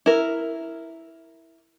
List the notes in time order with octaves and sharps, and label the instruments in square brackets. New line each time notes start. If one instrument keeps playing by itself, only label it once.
[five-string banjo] E4 A#4